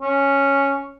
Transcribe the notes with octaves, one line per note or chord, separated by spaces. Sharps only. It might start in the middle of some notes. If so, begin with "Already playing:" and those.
C#4